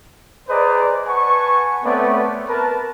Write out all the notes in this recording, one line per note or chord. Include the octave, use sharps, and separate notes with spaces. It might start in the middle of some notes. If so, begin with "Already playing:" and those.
G#4 B4 C5 D5 D#5 A#5
B4 F#5 G#5 A5 C#6
A3 B3 C4 B4 C#5 D5
A#4 B4 A5